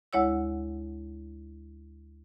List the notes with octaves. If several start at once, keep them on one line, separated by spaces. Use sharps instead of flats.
D2 G#3 E4 C#5 F#5 E6